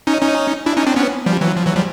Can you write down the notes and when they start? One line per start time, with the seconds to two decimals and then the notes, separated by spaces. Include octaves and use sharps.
0.07 C#4 D#4
0.22 C#4 D#4
0.66 D4 E4
0.77 C#4 D#4
0.87 C4 D4
0.96 B3 C#4
1.26 F3 G3
1.41 E3 F#3
1.57 F3
1.66 E3 F#3
1.76 F3 G3